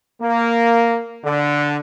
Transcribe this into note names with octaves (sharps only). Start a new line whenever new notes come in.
A#3
D3